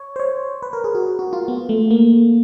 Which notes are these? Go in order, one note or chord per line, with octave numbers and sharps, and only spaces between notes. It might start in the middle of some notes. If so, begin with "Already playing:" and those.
Already playing: C#5
C5
C#5
B4
A#4
G#4
F#4
F#4
F4
B3
A3
A#3